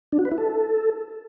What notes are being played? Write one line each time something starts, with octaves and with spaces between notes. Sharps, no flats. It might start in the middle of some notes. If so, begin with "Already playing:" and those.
D4
F#4
B4
E4
A4